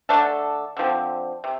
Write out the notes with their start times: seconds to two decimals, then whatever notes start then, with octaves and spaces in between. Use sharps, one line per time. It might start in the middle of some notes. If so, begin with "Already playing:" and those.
0.09 D3 A3 D4 A4
0.77 D3 F3 C4
1.44 C3